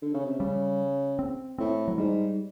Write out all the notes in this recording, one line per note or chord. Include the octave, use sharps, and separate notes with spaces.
D3
C#3
C3
C#3 G3
C4
A2 C4
F#3
G#2 G3